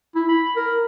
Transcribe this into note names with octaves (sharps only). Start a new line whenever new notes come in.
E4
B5
A#4